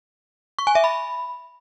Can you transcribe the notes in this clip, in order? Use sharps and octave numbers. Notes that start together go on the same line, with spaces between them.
C#6
G#5
E5
B5